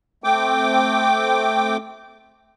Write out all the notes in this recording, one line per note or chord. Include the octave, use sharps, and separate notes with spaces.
A3 C4 G5 D6